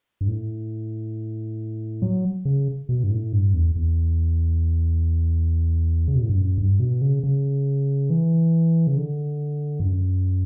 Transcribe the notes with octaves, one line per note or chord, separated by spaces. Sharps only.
G2
A2
F#3
C#3
B2
G2
A2
G2
E2
E2
C#3
B2
A2
G2
F#2
G2
B2
C#3
C#3
E3
C#3
D3
G2
F#2